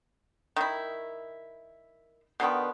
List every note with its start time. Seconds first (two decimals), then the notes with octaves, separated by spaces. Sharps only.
0.56 D#3 E4
2.40 B2 D3 D#3 B3